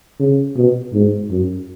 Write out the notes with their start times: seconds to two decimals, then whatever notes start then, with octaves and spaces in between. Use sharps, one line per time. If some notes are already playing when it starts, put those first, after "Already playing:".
0.20 C#3
0.56 B2
0.93 G#2
1.31 F#2